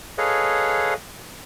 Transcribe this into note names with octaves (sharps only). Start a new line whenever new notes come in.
G#4 A4 B4 C#5 D#5 F5